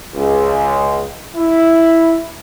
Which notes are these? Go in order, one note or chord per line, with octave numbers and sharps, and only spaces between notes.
C#2
E4